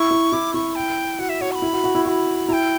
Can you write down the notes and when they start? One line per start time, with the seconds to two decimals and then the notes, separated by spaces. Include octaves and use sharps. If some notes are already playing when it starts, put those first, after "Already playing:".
Already playing: E4 C#6
0.11 E4
0.32 E4 D6
0.54 E4 C#6
0.75 G5
1.19 F#4 F#5
1.29 E5
1.41 F#4 C#5
1.52 C#6
1.55 B5
1.62 E4
1.73 F#4
1.84 F#4
1.95 E4
2.05 F#4 B5 C#6
2.48 E4 G5 A#5